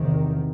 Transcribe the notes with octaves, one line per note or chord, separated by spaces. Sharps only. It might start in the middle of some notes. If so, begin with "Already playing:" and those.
Already playing: E2 C3 D#3